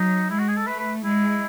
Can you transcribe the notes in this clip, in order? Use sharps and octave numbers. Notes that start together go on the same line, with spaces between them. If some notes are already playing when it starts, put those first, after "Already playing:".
Already playing: F#3 D#4
G#3 E4
F#4
G#4
A4
A3 B4
B4
G#3 E4